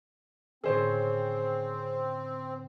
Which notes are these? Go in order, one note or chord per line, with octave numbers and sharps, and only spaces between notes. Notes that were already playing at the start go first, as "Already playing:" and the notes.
A2 D3 C4 C#4 G#4 C5 C#5